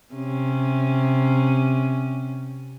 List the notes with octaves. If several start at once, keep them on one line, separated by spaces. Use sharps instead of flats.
C3 C#4